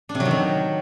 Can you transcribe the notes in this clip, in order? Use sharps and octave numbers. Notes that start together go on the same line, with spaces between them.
D4
C3
F#3
D#3
F#3